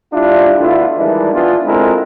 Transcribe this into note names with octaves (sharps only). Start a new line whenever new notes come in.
G3 D4 E4 F4
B2 D3 A3 E4 F4
D#3 E3 G3 G#3 D4 E4
E3 B3 D4 F4
D3 G#3 C4 E4 F4 A#4